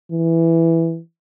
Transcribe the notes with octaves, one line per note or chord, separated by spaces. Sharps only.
E3